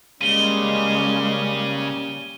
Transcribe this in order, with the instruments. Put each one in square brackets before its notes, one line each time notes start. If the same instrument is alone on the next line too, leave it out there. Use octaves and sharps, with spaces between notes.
[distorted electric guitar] C#3 [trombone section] G3 A#3 C#4 [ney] G#3 [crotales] D#7 G7